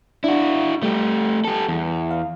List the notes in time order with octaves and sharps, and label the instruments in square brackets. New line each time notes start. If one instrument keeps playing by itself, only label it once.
[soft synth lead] D4 [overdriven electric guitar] E4 F#4
[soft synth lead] G3 [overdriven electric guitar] A3 G4
[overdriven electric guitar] G4 A4
E2
[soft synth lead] F5